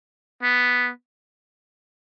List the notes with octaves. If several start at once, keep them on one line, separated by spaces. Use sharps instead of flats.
B3